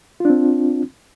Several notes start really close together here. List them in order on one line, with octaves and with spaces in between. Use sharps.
F4 D4 C4